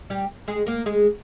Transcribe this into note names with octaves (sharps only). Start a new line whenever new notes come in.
G3 G4
G#3 G#4
A#3 A#4
G#3 G#4